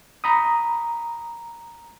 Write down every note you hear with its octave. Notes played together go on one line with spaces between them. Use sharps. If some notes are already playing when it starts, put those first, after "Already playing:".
A#5 B5 D#6